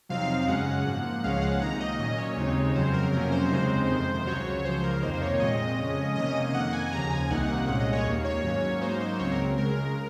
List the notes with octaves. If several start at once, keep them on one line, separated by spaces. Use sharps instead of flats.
F2 C3 F#3 C4 D#4 F5
F#2 C#3 G#3 C#4 F#5
G#2 F3 A#3
C#2 C#3 F3 G#3 C#4 F5
F#5
C3 D#3 A#3 D#4 A#5
D#5
A#2 F#3 C#4 D#5
C#5
D#2 C#3 G#3 C4 D#4
F2 C#3 F#3 C4 C5
A#4
F2 C3 F#3 A#3 C#4 A#4
C5
D#2 C#3 G#3 C4 D#4
F2 C3 D#3
C#2 C#3 F#3 C#5
C#2 C#3 F3 C5
A#4
F2 C3 D#3 A#3 D#4 C5
C5
C#5
A#2 G#3 C4 D#5
F2 C#3 G#3 C#4
C3 D#3 A#3 C#4 D#5
F2 D#3 A#3 F#5
G#5
D#2 C#3 F3 A#5
G#5
C2 C3 D#3 A#3 D#4 F#5
C2 A#2 G#3 C#4 F#5
D#5
C#5
D#2 D#3 A#3
C#5
G#2 F#3 A#3 C#4
G#2 F#3 A#3 D#4 C5
C5
C#2 C#3 F#3 C4 C#5
A#4
C#2 C#3 G#3 A#4